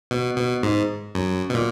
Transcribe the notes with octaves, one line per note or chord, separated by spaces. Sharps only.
B2
B2
G#2
F#2
B2
A#2